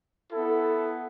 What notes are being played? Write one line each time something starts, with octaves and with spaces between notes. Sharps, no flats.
B3 E4 A4